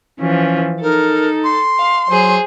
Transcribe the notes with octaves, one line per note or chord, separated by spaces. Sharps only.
E3 F3 C#4
D#4 A4 A#4
C6
F5
F#3 G#4 C5